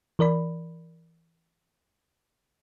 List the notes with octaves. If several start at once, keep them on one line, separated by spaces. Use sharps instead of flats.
E3 A#4 D5 B5